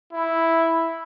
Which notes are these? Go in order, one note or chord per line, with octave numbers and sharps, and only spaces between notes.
E4